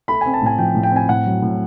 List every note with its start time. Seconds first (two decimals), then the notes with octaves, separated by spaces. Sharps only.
0.08 A3 B5
0.21 C4 G#5
0.33 A5
0.42 A2 G#5
0.59 F3 G5
0.75 A2
0.83 G5
0.92 C4 G#5
1.08 A2 F#5
1.26 F#3
1.42 A2